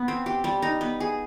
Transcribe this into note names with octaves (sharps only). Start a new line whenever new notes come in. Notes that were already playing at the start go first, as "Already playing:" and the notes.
Already playing: B3
C4
G4
G3
D#4
B3
G#4